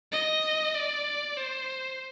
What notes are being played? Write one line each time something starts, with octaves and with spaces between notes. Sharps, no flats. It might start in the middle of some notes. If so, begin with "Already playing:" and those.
D#5
D5
C5